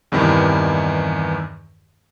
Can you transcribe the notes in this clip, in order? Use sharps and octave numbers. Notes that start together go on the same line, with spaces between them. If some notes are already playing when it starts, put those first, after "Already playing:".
E2 G2 C3 D#3 E3